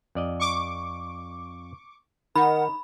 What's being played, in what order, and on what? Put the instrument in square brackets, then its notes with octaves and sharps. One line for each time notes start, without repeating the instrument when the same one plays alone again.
[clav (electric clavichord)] F2 D5 D#5
[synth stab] C#6 D6
[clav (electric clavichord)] D#3 [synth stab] D#4 [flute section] A#4 F#5 [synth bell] B5